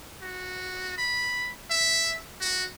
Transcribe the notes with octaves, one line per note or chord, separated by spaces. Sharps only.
F#4
B5
E5
F#4